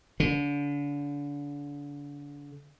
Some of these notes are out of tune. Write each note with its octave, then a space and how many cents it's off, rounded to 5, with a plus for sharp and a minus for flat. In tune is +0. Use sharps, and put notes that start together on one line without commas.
D3 -35